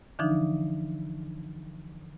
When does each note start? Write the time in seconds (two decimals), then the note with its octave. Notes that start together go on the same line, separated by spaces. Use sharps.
0.19 D3 E3 F3 D4 D#4